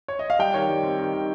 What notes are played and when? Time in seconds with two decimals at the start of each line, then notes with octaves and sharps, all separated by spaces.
0.08 C#5
0.19 D#5
0.30 F5
0.39 G3 G5
0.54 D#3 C#5
0.69 G3
0.83 C4
0.98 D#3
1.13 D#3